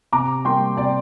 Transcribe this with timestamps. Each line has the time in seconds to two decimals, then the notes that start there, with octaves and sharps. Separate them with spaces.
0.13 C3 A#5 D6
0.45 G3 A#3 G5 C6
0.77 C3 D5 G5